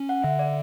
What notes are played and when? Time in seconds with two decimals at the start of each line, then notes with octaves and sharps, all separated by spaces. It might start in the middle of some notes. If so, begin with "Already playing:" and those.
Already playing: C#4
0.09 F#5
0.24 D3 E5
0.39 D5